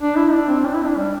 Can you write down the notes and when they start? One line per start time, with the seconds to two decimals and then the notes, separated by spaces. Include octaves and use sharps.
0.01 D4
0.16 E4
0.33 D4
0.49 C4
0.65 D4
0.75 E4
0.87 D4
0.97 G3